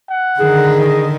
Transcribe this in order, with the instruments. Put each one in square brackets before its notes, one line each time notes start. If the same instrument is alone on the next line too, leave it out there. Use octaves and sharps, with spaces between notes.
[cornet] F#5
[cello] D3 D#3 [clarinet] G#4
[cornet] D#5